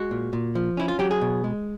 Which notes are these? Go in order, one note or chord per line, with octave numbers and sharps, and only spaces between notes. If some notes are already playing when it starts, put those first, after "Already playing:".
Already playing: G#3 F#4
A#2
A#2
F3
C#4 E4
F4
F#3 G4
G#4
B2
G#3